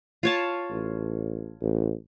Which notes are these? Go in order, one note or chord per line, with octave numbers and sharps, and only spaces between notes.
F4 C#5 A5
A1
A1